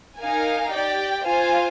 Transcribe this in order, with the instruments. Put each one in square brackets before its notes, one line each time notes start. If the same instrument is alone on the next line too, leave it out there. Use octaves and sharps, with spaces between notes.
[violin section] D#4 A#4 F5 G#5
G4 D5 G5
F4 C5 F5 G#5